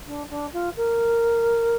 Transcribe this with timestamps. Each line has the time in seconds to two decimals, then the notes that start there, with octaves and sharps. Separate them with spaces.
0.07 D4
0.30 D4
0.53 F4
0.76 A#4